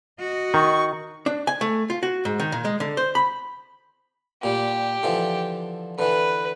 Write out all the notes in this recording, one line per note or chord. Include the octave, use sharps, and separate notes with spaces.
F#4 D#5
D#3 C#6
D4
G#5
A3
F4
F#4
G#2
D#3
A#2
G#3
D3
C5
B5
A#2 G3 G4
D3 E3 F3
D3 E3 B4